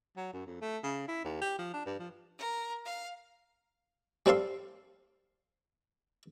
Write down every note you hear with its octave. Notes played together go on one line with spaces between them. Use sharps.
F#3
F#2
F2
A3
C#3
E4
D#2
G4
F3
D4
G2
F3
A#4
F5
G3 C4 A4 F5 C6